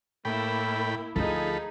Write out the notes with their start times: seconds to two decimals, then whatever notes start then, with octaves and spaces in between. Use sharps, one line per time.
0.25 A2 A#3 E4 G5 B5
1.16 D2 F3 D#4 G#4 A4 B5